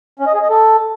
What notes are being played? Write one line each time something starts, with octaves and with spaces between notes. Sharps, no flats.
C#4
D#5
G#4
D#5
A4